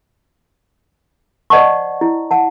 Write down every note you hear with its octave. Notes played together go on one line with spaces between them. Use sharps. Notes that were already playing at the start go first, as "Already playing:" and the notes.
C5 D5 D#5 F#5 A5 C#6
E4
F#5 A5